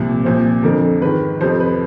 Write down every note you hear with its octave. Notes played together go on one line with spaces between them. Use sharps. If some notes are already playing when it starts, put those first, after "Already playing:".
Already playing: C2 A#2 F3
C2 A#2 F3 C5
F2 D3 F3 A#4
G#2 D#3 B4
F2 C3 F3 C5
B4